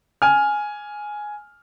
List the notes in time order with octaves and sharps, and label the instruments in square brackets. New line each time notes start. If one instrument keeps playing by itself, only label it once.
[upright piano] G#5 F6